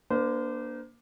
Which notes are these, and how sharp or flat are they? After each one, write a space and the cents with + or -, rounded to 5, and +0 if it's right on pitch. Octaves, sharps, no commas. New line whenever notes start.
A#3 +20 D4 +0 C5 -30